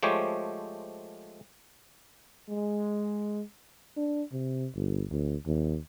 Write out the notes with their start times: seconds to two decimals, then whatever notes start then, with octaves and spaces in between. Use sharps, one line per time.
0.03 F3 G#3 A3 G4 C5 C#5
2.50 G#3
3.97 D4
4.32 C3
4.75 G1
5.11 D2
5.46 D#2